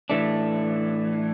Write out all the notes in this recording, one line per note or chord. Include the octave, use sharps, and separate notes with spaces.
A2 E3 A3 D4